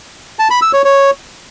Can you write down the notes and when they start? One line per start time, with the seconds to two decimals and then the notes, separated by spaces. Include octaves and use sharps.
0.39 A5
0.50 B5
0.62 E6
0.73 C#5
0.85 C#5